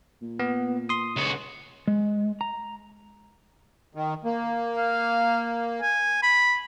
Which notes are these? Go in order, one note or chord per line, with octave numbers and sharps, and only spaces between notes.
A#2
B3
C6 D#6
C#2 F#4
G#3
A#5
D#3
A#3
F5
G#5
B5